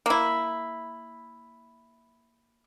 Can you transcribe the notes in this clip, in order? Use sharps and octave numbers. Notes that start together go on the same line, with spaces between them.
A#3 E4